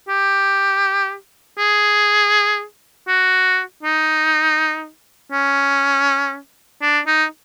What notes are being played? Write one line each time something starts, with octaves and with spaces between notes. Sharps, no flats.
G4
G#4
F#4
D#4
C#4
D4
D#4